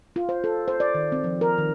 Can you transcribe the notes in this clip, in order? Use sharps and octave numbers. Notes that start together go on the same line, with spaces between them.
F4
C5
A4
C5
D5
D#3
C4
F3
A#4
D#3